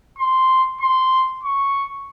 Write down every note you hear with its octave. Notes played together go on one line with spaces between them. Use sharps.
C6
C6
C#6